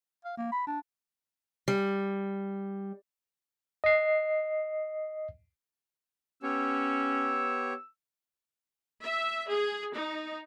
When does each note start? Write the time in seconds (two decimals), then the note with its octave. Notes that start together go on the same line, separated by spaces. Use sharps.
0.25 F5
0.37 A#3
0.52 B5
0.67 D4
1.68 G3
3.84 D#5 C7
6.43 B3 C#4 G4 C#5 E6
9.01 E5
9.48 G#4
9.94 D#4